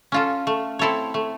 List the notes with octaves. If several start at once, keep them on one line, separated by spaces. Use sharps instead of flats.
C#4 F4 A4
A3
C4 E4 A4 C#5
A3